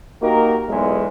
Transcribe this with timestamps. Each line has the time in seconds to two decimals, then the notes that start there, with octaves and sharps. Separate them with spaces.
0.22 A#3 D#4 F#4 G4 A#4
0.68 B1 E2 G#3